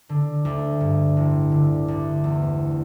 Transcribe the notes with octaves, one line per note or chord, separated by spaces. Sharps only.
D3
D2
G2
A1
D3
D2
E2